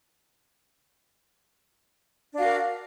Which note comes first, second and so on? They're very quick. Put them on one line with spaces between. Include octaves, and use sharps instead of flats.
D4 F#4 F5 A#4